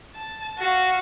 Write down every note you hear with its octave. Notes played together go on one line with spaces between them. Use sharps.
A5
F#4 F5